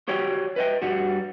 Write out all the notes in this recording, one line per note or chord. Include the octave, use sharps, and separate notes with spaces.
F#4 G4 C#5 D5 G5
B4 D#5 G5
G2 G3 F#4